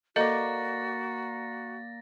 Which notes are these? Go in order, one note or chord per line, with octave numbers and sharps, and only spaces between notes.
A#3 F#4 A4 D5 D#5 A6 A#6